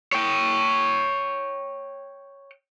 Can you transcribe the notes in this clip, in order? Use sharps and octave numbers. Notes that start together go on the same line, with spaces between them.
C#5 G5